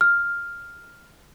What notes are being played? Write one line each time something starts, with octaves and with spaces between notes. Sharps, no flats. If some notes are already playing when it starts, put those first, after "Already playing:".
F6